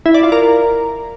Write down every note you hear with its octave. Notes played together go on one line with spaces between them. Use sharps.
E4
D5
F4
A#4